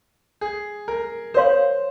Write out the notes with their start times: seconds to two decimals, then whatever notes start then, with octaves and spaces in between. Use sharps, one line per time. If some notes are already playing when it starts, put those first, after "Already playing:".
0.41 G#4
0.88 A#4
1.34 A#4 C5 C#5 F5 C6